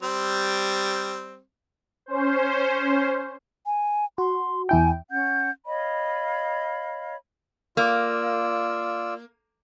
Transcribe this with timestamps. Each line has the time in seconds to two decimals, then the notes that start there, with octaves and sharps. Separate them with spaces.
0.03 G3 C4
2.06 C#4 C5
3.66 G#5
4.18 F#4 C6
4.69 E2 E4 G5 G#5
5.11 C#4 F#5 G6
5.66 C#5 D#5 F5 B5
7.77 A#3 F4 D5 E6